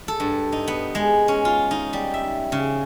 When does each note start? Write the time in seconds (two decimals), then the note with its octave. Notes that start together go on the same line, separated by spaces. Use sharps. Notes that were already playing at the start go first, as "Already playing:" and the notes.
0.08 A4
0.20 G2
0.52 D#4
0.68 B3
0.95 G#3
1.28 C#4
1.45 F4
1.71 D#4
1.93 G3
2.14 E5
2.52 C#3